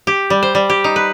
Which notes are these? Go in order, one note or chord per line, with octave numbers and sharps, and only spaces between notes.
G4
G3
C5
G3
G4
D#4
B4